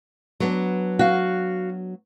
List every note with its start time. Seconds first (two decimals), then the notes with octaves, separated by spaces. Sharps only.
0.40 F#3 B3 D4
0.99 F#4 F5